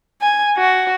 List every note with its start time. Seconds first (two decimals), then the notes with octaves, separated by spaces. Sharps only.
0.21 G#5
0.57 F#4